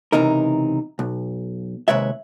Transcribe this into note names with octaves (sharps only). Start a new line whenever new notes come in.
C#2 C3 E3 D#4 A#4
B1
D#2 C3 G#3 B4 C#5 E5